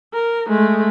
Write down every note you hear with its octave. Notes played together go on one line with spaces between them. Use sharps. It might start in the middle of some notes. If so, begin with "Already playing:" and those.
A#4
G#3 A3